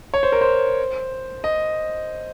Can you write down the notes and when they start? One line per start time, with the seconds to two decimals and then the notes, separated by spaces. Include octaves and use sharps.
0.14 C#5
0.23 C5
0.32 A#4
0.41 C5
1.44 D#5